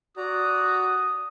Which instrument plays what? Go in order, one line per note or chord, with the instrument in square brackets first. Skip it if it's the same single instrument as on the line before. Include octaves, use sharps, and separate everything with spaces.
[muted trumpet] F#4 [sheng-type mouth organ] D5 A#5 [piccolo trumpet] D#6